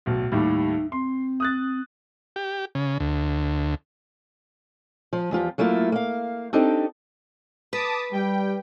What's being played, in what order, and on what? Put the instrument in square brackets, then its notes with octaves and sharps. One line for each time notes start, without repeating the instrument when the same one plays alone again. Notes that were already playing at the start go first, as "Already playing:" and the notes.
[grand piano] D1 B1
[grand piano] D#2 A2 G3 [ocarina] D#4
[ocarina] C4 [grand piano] C6
[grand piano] D#6 F#6 A6
[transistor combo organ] G4
C#3
D2
[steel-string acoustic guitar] F3
E2 F3 F4 G4
F#3 A3 A#3 E4 F4
A#3 F5
C4 D4 D#4 G4 A4
[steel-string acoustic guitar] B4 [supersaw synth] A5 D6 D#6
[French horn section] G3 [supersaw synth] G5